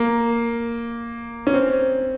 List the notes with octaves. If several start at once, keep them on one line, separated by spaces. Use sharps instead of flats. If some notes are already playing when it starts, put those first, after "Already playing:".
Already playing: A#3
C#4
C4